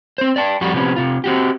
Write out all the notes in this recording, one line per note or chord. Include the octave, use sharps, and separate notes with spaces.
C4 C5
D5 G5 A5
F2 G3 F#4
C3 F3 B3 C#4
C3 F4
C4 F#4 G4